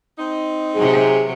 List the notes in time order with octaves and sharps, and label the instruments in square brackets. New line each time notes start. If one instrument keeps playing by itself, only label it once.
[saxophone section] C4 D#4
[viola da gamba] C3 F#3 [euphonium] G#4